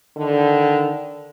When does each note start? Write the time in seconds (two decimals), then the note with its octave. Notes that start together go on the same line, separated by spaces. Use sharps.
0.17 D3 D#3